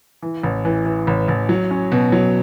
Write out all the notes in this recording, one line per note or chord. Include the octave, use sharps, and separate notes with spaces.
E3
A1
E3
E3
A1
A1
F#3
C#4
B2
F#3